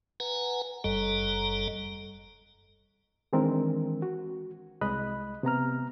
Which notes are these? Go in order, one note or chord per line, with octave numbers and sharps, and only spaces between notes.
B4 F#5 G#5 A#5
F#1 F#2 G3 A4 D#5 A#5
D#3 E3 G#3 C4 D4 A#4
F#4
C2 G#3 D#5 B5 F#6
C3 B3 A#5 F6